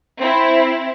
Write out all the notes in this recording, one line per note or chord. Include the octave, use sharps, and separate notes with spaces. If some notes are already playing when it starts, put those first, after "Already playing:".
C4 E4